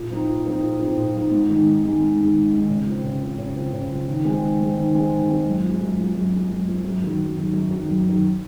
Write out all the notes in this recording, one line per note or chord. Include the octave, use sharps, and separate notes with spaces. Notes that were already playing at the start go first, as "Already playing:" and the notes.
Already playing: A#2
F3 C4 D#4
A#2
F3 C4 D#4
A#2
F3 C4 D#4
A#2
F3 C4 D#4
G#2
D#3 G#3 D#4
G#2
D#3 G#3 D#4
G#2
D#3 G#3 D#4
G#2
D#3 G#3 D#4
C#3
F3 C4
C#3
F3 C4
C#3
F3 C4
C#3
F3 C4
D#3
G#3 C4
D#3
G#3 C4
D#3
G#3 C4
D#3
G#3 C4
F#2
F3 G#3
F#2
F3 G#3
F#2
F3 G#3
F#2
F3 G#3
F#2
D#3 F#3
F#2
D#3 F#3
F#2
D#3 F#3
F#2
D#3 F#3